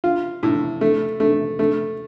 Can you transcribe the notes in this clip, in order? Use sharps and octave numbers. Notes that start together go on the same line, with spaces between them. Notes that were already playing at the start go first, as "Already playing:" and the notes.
F4
A2
A3
A3
A3